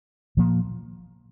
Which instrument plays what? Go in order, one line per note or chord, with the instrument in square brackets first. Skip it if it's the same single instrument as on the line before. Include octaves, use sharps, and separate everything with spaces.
[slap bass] A#2 F3 A#3